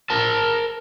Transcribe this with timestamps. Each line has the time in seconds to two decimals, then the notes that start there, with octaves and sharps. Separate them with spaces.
0.10 A#4 A5